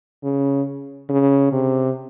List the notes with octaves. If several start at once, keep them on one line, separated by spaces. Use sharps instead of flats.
C#3
C#3
C3